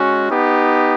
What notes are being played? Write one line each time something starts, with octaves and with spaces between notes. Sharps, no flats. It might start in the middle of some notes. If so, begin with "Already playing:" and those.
Already playing: G#3 C#4 F#4
B3 D#4 G4